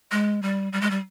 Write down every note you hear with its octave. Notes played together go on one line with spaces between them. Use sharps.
G#3
G3
G3
G#3
G3